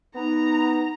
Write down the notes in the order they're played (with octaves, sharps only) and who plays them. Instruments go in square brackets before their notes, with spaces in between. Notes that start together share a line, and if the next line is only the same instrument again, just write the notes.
[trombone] B3 [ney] D#4 [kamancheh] A#5